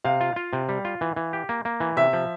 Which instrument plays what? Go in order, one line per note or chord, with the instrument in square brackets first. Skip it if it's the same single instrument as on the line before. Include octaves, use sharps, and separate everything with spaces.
[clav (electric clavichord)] C3 [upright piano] F5
[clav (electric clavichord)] F4
F4
C3
G3
F4
E3
E3
G4
A#3
A#3
E3
[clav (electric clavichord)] C3 [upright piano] E5
[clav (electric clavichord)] F3